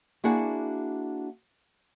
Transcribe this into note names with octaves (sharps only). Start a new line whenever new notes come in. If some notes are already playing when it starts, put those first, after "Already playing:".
A#3 D4 E4 F#4 G#4 F#5